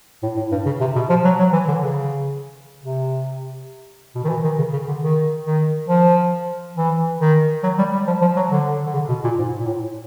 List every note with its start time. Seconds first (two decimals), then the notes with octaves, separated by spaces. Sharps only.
0.23 A2
0.37 A2
0.52 G2
0.66 C#3
0.81 C3
0.96 B2
1.10 F3
1.25 F#3
1.39 F#3
1.53 E3
1.68 D3
1.82 C#3
2.84 C3
4.15 B2
4.24 D#3
4.29 E3
4.44 D#3
4.58 C#3
4.73 C#3
4.88 D3
5.03 D#3
5.46 D#3
5.89 F3
6.77 E3
7.20 D#3
7.63 F#3
7.79 G3
7.93 G3
8.07 F3
8.22 F3
8.36 F#3
8.51 D3
8.86 D3
8.94 C#3
9.09 B2
9.24 A#2
9.39 G#2
9.60 A#2
9.67 A2